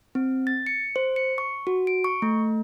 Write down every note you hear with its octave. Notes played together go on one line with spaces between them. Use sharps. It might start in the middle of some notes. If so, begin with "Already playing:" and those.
C4
A6
C#7
C5
C#7
C#6
F#4
D7
C#6
A3